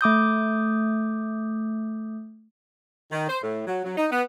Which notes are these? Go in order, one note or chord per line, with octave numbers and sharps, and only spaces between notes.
A3 D6 D#6 G6
D#3
C5
A2
F#3
F#3
D#4
B3